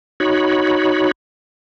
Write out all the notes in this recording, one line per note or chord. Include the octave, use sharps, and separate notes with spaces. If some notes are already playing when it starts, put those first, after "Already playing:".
D#4 F#4 C#5 B5